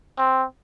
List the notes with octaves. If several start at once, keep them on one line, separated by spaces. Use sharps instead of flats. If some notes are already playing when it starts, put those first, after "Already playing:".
C4